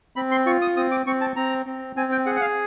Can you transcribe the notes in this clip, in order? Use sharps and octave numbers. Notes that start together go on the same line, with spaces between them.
C4 B5
C6
F4 C#6
D#6
C4 D#6
D6
C4 C#6
A5
C4 A#5
C4
C4 G#5
G5
G#4 F#5
F#5
F5